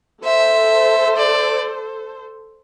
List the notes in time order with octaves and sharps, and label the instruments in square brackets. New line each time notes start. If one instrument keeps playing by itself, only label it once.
[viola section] A4 C5 [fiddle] E5
[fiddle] D5